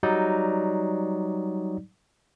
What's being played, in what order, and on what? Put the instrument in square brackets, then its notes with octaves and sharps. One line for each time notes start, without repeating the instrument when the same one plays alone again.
[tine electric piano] F#3 G3 D#4 D5